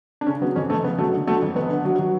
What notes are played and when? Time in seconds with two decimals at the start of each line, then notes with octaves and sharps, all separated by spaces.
0.21 D4
0.27 C#3 C#4
0.41 F#3 B3
0.56 F2 C#4
0.70 F1 A3
0.84 C#3 B3
0.98 F#3 A3
1.12 D3
1.27 F#3 A3
1.42 F2
1.55 F1 B3
1.70 D3
1.85 F#3
1.99 F#3